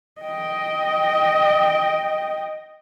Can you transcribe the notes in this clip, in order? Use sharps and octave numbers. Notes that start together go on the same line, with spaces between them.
D#5 G5